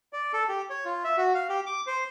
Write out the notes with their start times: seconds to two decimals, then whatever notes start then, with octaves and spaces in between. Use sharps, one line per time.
0.13 D5
0.33 A4
0.49 G4
0.70 C#5
0.85 F4
1.04 E5
1.17 F#4
1.34 F5
1.49 G4
1.66 D6
1.87 C5